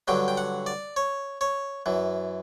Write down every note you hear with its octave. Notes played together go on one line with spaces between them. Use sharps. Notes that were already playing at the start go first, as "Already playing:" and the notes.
G2 D3 F#3 G5
G5
F#5
D5
C#5
C#5
F#2 E3